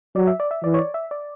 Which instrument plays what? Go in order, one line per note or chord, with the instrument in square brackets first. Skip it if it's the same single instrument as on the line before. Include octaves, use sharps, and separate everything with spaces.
[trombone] F#3 [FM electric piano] D5
[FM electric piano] E5
D5
E5
[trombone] E3 [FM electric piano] D5
[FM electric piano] C#5
D5
E5
D5